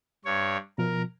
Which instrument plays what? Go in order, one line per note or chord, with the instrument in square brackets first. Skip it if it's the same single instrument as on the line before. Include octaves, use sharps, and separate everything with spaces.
[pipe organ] G2 C#5
[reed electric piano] B2 F3 [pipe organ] A#4